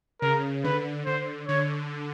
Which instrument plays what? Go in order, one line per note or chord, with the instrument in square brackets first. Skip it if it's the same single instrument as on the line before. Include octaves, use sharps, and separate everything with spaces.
[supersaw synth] C#3 [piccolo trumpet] A#4
[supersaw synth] D3 [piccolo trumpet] B4
[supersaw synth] D3 [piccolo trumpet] C5
[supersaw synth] D3 [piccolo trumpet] C#5